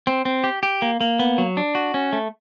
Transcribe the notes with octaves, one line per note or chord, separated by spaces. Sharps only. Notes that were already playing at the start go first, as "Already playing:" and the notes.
C4
C4
G4
G4
A#3
A#3
B3
F#3
D4
F#4
C#4
A3